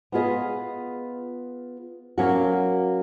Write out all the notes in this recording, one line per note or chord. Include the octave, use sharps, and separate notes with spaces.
B3 F4 G#4 B4 D#5
F#3 A#3 C#4 F#4